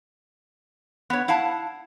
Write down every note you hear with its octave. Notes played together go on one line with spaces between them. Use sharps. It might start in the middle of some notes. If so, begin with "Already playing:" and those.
B3 C#5
E4 F5 F#5 A5